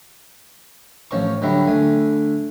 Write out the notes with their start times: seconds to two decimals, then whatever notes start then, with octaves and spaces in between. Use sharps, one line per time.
1.11 A1 F3 C#5 A5 C#6
1.42 D3 F#3 G3 E4
1.67 D3 A3 G#5